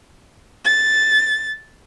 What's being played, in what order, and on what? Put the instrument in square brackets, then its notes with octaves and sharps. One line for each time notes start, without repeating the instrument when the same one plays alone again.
[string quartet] A6